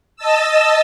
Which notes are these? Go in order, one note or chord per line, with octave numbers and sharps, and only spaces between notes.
D#5 A5 E6